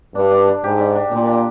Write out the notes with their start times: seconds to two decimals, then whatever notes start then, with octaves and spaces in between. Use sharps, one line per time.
0.15 G2 D4
0.31 D4
0.48 D4
0.64 G#2 G4
0.79 D4
0.95 D4
1.11 A#2 D4
1.28 D4